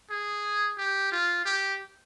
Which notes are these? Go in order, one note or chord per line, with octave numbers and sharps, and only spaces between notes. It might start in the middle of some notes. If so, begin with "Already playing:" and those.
G#4
G4
F4
G4